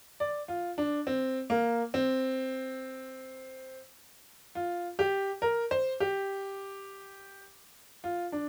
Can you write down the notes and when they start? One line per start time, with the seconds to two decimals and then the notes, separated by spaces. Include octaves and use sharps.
0.20 D5
0.48 F4
0.78 D4
1.07 C4
1.50 A#3
1.94 C4
4.55 F4
4.99 G4
5.42 A#4
5.71 C5
6.00 G4
8.04 F4
8.32 D4